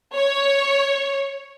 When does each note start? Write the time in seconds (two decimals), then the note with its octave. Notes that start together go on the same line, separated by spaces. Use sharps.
0.14 C#5